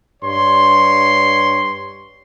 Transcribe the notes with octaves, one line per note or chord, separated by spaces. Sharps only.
G2 C#5 C6